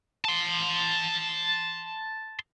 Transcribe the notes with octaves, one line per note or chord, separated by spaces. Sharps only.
A5 C6